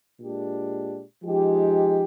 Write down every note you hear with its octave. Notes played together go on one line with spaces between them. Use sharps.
A#2 G#3 D4 G4
F3 G#3 D#4 G4